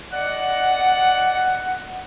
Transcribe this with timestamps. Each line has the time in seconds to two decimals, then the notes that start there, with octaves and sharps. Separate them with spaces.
0.12 D5 D#5 F#5